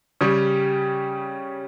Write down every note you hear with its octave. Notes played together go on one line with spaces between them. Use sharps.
C#3 G3 C#4